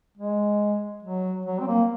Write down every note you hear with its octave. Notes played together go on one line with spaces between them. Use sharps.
G#3
F#3
F#3
C4
A#3